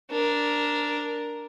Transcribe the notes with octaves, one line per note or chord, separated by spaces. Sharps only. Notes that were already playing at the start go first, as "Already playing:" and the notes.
D4 A#4